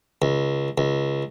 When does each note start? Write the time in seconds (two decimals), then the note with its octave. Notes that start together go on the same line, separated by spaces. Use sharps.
0.22 C#2
0.78 C#2